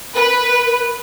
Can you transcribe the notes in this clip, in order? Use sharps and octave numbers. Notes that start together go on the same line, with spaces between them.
A#4 B4